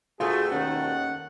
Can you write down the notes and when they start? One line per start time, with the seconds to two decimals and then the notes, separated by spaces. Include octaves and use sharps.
0.20 G2 B2 A3 F4 F#4 G#4
0.52 D#2 D#3 C#4 F#5